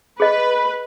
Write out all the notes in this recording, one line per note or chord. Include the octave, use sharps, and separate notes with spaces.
G#4 B4 D#5